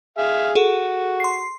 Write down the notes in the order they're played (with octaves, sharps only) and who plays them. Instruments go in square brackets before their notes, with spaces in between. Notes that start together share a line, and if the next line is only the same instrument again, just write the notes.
[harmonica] G#4 E5 F5
[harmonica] F#4 [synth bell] G#4 A4
[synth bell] C6 C7